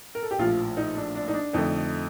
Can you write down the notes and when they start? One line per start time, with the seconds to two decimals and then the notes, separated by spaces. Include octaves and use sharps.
0.15 A#4
0.23 A4
0.31 G4
0.39 A#1 A2 F3 F4
0.77 D#4
0.97 D4
1.15 D4
1.28 D#4
1.34 D4
1.53 F2 D3 A3 D#4